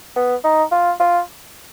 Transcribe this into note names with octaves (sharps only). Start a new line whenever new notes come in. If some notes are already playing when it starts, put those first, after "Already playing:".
B3
D#4
F4
F4